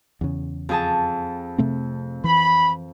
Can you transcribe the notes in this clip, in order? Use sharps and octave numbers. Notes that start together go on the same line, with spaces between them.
E2 C#3
F2 G#4 A5
C3 A3 C4
E3 B5